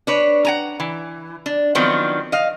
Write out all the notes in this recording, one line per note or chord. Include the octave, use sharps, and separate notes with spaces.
D4 B4 C#5
F#5 G#5 A#5
E3
D4
D#3 F3 F#3 B3 C4 D4
D#5 F5